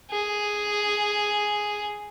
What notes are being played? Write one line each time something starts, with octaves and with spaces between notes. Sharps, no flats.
G#4